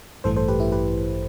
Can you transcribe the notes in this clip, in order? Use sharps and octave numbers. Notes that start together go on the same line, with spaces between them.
A1 G2 E3 A3 A4 C5
A4 C5
G4 B4
E4 G4
G4 B4